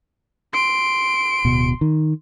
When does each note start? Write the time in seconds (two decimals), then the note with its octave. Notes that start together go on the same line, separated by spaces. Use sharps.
0.53 C6 D7
1.45 D1 B2
1.81 D#3